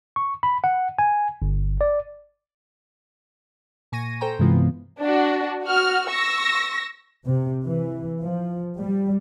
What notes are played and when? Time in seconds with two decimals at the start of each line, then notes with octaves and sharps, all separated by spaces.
0.16 C#6
0.43 B5
0.64 F#5
0.99 G#5
1.42 G1
1.81 D5
3.92 A#2 G#5 C#6 A#6 D#7
4.21 A4 C5 G5 A#5
4.39 G2 C3 E3 G#3 B3 F4
5.00 D4 F#4
5.63 F#4 F6
6.09 C#6 E6 A#6
7.25 C3
7.65 E3
8.22 F3
8.78 G3